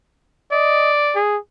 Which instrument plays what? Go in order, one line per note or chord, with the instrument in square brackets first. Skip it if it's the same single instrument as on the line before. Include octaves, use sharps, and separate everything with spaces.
[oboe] D5 [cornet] D#5
[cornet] G#4